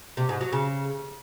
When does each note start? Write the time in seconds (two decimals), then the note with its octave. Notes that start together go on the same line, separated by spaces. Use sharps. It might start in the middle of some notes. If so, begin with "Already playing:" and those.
0.17 C3
0.29 G#2
0.41 F#3
0.53 C#3